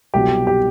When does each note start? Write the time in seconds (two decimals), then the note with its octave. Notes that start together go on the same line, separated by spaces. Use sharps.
0.14 C2 B2 F#3 G4
0.47 G4